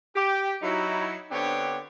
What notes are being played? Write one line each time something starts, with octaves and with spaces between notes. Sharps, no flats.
G4
F#3 D#4 E4
D3 B3 C4 D4 G4 C#5